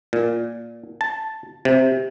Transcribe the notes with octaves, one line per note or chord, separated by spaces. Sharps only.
A#2
A5
C3